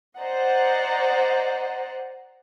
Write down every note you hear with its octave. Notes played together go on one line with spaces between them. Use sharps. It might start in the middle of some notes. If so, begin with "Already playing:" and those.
C5 D5 D#5 F#5 A#5